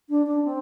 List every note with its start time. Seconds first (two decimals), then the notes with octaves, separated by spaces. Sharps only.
0.09 D4
0.26 D4
0.44 C4